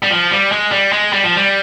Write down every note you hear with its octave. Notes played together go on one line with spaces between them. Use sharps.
G3
F3
G3
G#3
G3
G#3
G3
F3
G3